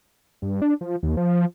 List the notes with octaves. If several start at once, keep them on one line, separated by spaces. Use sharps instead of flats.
G2
D4
F3
D#2
F3